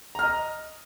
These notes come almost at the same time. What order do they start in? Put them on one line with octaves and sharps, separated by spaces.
A#5 F6 D#5